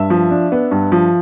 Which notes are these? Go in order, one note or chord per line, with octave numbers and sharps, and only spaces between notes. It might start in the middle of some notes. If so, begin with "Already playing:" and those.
Already playing: G2 E5
F3
D4
B3
G2
F3